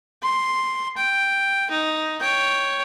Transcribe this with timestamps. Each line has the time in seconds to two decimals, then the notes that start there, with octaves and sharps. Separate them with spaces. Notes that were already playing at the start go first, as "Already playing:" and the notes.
0.22 C6
0.97 G5
1.70 D#4
2.19 C#5 G5